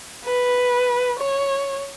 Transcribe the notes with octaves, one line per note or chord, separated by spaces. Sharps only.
B4
C#5